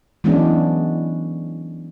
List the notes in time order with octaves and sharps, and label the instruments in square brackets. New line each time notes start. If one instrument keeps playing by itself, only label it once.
[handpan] E3 F#3 G#3 B3 C#4 D4